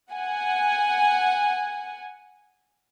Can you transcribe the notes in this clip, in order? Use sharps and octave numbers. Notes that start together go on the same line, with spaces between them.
F#5 G#5